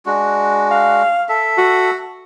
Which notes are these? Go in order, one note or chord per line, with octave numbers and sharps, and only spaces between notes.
G#3 D4 F#4
F5
A4 E5
F#4